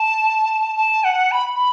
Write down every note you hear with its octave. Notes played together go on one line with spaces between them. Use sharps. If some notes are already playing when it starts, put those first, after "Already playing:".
Already playing: A5
A5
F#5
B5
B5